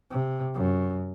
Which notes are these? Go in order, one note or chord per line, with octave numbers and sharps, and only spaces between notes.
C3
F#2